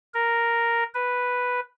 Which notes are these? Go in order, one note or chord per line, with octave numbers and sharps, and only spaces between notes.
A#4
B4